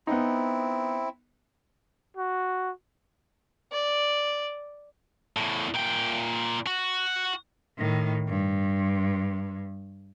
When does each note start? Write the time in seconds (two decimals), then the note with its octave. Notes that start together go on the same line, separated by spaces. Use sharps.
0.07 B3 C4 D#4 E4
2.17 F#4
3.72 D5
5.37 E2 A2
5.74 A#2 G5
6.67 F#4
7.78 A2 D#3
8.28 G2